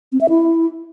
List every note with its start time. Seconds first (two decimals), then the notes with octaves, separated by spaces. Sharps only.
0.12 C4
0.21 E5
0.29 E4